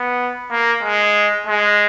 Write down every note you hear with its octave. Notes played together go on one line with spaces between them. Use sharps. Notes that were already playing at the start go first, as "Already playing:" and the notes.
Already playing: B3
A#3
G#3
G#3